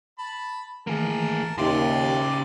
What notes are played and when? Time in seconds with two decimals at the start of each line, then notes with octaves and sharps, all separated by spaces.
0.19 A5 B5
0.87 D#3 E3 A3 A#3 G#4 A#4 A5
1.58 D#2 C#3 G4 D5 E5 G#5 C6 D6